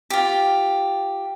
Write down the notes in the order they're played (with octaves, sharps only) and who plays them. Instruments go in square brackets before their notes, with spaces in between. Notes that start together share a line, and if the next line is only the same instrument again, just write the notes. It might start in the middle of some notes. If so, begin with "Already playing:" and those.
[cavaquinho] F4 G4